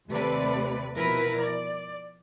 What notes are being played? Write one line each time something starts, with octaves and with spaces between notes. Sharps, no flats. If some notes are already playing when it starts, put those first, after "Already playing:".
D#2 C3 A3 B4 D5
B2 F3 E4 A#4 B4
D5